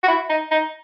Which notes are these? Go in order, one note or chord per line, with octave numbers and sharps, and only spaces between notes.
F#4
E4
D#4
D#4